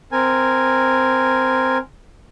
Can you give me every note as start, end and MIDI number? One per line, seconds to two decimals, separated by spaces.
0.12 1.78 60
0.12 1.78 70
0.12 1.78 80